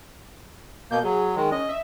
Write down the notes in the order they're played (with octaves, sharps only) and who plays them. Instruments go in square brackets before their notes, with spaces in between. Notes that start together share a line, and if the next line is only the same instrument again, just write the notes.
[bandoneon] B2 A#3 [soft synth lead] G6
[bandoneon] F#3 [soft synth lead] G#4
[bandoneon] D#3 G#3
[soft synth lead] C#4 [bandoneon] D#5
[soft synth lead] E5